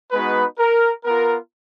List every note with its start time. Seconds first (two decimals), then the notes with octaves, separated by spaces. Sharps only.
0.11 G#3 B3 D#4 F#4 B4
0.59 A#4
1.05 B3 F4 A#4